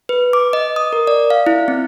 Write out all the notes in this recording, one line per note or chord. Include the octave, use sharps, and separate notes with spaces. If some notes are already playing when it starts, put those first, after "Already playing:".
B4
D6
D#5
D#6
A#4
D5
F5
E4
C4